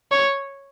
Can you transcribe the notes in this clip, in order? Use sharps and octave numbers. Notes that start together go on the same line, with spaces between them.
C#5